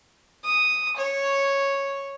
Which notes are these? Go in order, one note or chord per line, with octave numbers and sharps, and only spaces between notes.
D#6
C#5